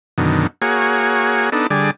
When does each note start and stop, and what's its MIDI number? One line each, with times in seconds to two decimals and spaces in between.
0.18 0.47 42
0.18 0.47 47
0.18 0.47 50
0.18 0.47 51
0.62 1.50 58
0.62 1.50 66
0.62 1.50 68
0.62 1.50 73
1.52 1.67 59
1.52 1.67 62
1.52 1.67 63
1.52 1.67 69
1.70 1.91 50
1.70 1.91 55
1.70 1.91 68
1.70 1.91 74